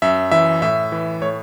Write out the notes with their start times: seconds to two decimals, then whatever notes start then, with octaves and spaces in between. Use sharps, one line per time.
0.02 F#2 E5
0.31 E3 E5
0.62 A2 E5
0.92 E3
1.22 A2 C#5